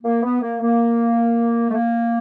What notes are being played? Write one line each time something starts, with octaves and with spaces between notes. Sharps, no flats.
A#3
B3
A#3
A#3
A3
A#3